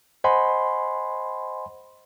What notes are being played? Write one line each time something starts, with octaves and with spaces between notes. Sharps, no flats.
C5 D#5 F#5 G#5 B5 C6